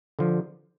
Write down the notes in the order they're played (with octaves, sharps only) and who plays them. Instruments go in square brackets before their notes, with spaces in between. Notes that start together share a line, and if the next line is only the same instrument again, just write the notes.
[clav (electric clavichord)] D3 F3